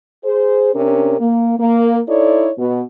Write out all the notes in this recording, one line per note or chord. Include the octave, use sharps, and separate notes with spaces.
G#4 C5
C3 C#4 D4 A#4
A#3
A#3
D#4 E4 A4 C#5 D5
B2